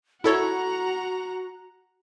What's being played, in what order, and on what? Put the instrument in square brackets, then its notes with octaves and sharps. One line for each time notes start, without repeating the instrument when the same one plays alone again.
[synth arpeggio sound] E4 A4 C#5 [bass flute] F#4 [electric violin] F#5 A#5